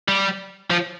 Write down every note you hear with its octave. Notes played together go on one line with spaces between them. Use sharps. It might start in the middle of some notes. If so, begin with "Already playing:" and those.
G3
F3